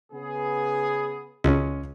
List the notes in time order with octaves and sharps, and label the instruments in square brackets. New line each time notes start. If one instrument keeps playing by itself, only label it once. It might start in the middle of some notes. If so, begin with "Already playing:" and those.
[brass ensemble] C#3 B3 G#4
[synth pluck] C#2 [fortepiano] G#3 C#4